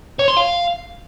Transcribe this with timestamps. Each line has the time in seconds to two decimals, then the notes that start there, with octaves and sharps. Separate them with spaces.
0.19 C#5
0.28 C6
0.37 F5